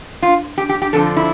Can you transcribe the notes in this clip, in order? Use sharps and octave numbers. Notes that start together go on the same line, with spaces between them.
F4
G4
G4
G4
F2 D3 F3 A4
E4